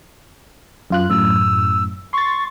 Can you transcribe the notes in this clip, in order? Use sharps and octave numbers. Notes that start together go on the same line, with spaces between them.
F#2 F4 F#6
F#2 A2 E6
C6 C#6 A6